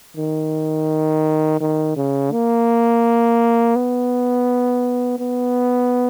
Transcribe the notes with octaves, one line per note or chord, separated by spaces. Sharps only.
D#3
D#3
C#3
A#3
B3
B3